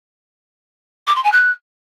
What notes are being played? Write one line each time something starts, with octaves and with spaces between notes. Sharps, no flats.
D6
C6
G#5
F#6